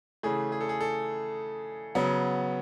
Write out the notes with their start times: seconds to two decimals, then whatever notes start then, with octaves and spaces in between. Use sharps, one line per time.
0.23 C#3 E3 A3 G#4
0.52 G#4
0.61 A4
0.69 G#4
0.81 A4
1.95 C#3 F#3 B3